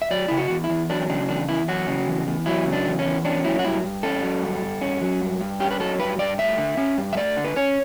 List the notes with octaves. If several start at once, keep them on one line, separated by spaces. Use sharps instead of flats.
E5
F#3 D5
C#3 E4
F#4
E2
E4
E2
F#3 D4
C#3 D4
E2 D4
E2 E4
F#3 F#4
C#3
E2
E2
F#3 E4
C#3
D4
E2
C#4
E2
C#4 D4
F#3 E4
F#4
G2 E4
G2
C#4 A4
F#3
G2
G2
C#4
F#3
G2
G2
C#4 G4
B4
F#3 A4
G2 B4
G2 D5
A3 E5
D3
C#4
G2
E5
A3 D5
D3
B4
C#4 C#5